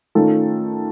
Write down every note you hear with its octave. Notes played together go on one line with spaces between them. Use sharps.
D#3 A3 C#4 F4 A4